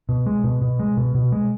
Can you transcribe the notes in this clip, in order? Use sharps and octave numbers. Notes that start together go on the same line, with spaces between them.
B2
G#3
B2
B2
G#3
B2
B2
G#3